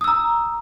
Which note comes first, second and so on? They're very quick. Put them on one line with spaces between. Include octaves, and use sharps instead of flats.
D#6 E6 A#5